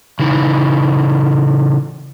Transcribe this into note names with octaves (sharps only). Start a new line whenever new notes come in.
C#3 E3 D#4